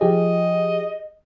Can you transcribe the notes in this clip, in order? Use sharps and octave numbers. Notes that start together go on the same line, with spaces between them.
F3 G4 G#4 D#5